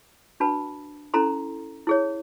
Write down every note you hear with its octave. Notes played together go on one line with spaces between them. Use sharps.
D4 F#4 B4 A5 B5
C#4 E4 A4 A#5 C6
E4 G#4 C#5